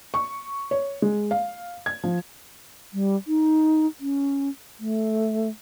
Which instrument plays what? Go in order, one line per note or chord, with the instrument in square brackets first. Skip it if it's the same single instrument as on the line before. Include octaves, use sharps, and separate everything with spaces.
[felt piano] C#6
C#5
G#3
F5
G#6
F3
[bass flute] G3
D#4
C#4
A3